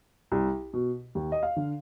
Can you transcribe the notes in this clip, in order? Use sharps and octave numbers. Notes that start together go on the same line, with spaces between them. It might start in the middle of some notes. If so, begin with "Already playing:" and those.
C2
B2
D#2
D#5
F5
D3